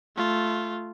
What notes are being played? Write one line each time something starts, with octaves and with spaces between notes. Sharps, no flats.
A3 F4